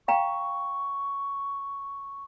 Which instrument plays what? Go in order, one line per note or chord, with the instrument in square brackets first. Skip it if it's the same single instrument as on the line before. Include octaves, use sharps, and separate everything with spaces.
[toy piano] F5 G5 A#5 [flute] C#6